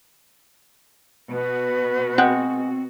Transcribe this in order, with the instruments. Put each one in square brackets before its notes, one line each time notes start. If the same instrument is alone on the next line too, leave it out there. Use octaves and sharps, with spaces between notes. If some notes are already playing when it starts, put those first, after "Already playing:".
[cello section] B2 F#4 [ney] B4
[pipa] G#3 F#5 G5 [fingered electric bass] C4